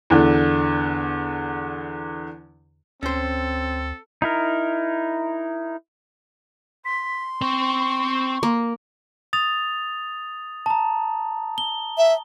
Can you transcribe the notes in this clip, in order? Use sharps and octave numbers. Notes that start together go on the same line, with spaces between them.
E2 D3
D2 C4 C#4 A4 C5
D#4 E4 A#4
C6 B6
C4 C5 C#6
A#3
D#6 A6 F7
A5 A#5
G7
E5